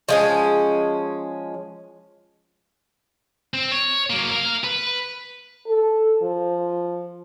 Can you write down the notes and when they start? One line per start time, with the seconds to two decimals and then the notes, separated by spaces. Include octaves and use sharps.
0.09 F3 G#3 C#4
3.54 C4
3.72 C#5
4.10 F#3 A#3
4.31 A#4 F5
4.64 B4
5.67 A4
6.22 F3